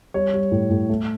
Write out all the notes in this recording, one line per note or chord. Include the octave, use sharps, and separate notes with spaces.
G3 C#5
G3
A2
A2
A3